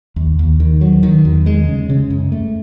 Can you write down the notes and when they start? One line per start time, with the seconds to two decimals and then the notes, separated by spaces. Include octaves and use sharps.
0.16 D#2
0.39 D#2
0.60 D#3
0.81 F#3
1.03 D#3
1.25 E2
1.46 G#3
1.68 C#3
1.90 C#3
2.10 F#2
2.32 A3